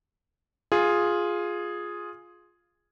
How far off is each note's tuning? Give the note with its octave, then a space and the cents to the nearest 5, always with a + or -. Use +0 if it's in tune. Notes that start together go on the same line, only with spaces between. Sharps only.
F4 +5 G#4 +0